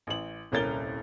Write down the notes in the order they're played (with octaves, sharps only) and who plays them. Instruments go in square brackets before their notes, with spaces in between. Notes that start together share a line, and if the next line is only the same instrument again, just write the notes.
[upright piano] A1 F#7
D#1 C2 C#4 A#4 A6 G7